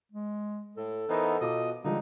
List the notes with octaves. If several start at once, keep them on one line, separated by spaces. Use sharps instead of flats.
G#3
A2 A4
E3 B3 D#4 A#4 C5 F#5
B2 F4 D#5 D6
D3 F3 G3 G#3 D#4